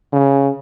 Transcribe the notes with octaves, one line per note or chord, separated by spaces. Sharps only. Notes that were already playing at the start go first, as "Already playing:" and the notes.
C#3